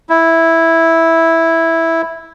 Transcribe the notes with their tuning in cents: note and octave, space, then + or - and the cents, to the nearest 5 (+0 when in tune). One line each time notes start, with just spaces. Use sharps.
E4 -5